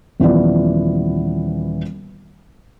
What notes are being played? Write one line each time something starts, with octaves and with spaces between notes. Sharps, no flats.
D#1 E3 F3 B3 D5